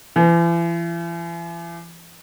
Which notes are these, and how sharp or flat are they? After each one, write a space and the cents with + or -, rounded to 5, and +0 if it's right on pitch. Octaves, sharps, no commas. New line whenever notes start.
E3 +40